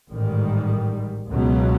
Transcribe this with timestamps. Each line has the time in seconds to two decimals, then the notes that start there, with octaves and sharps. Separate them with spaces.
0.13 A1 G#2 D#3 G3
1.30 C#2 B2 F#3